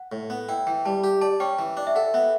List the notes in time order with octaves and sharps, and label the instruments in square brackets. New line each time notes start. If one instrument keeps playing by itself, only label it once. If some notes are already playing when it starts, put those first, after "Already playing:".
Already playing: [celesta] F#5
[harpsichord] A2
B3
[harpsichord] E4 [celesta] G5
[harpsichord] E3 [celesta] G5
[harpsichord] G3 [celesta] A5
[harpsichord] G4
[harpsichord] D5 [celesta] A5
[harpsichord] C#4 [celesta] G5
[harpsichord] E3
D4
[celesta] E5
[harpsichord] A4 [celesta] F#5
[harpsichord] B3 [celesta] E5